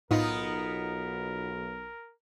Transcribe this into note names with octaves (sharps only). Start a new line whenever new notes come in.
B1 A2 B3 D#4 F4 A#4